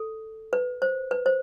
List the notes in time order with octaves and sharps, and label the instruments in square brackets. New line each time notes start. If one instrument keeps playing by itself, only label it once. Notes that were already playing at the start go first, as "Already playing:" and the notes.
Already playing: [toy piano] A4
B4
C5
B4
C5